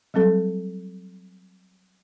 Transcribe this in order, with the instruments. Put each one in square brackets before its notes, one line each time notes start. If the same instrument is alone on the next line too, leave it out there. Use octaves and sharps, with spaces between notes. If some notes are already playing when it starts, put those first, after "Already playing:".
[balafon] F#3 G3 C4 A4